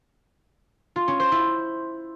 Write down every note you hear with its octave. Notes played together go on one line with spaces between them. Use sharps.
F4
C#4
C5
E4